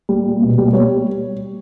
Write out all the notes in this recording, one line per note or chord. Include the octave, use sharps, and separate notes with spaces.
G3
A#2
B2
G3
G3 C#5